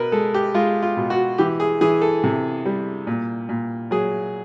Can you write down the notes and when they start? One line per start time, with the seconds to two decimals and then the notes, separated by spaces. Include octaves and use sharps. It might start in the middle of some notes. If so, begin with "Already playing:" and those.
Already playing: B2 A#4 B4
0.12 G#3 A4
0.34 G4
0.54 G#3 F4
0.82 F4
0.97 B2
1.10 F#4
1.38 E3 G4
1.60 G#4
1.81 E3 G#4
2.02 A4
2.24 C3
2.65 G3
3.07 A#2
3.49 A#2
3.91 F#3 G#4